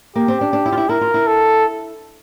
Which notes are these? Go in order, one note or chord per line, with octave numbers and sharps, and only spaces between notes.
A#3 G4
C4
D4
D4
E4
F4
E4
E4 A#4
F4
E4
A4